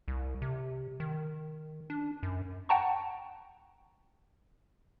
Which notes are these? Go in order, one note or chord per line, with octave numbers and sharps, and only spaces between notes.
C2
C3
D#3
D4
F#2
F#5 G5 A5 A#5 C#6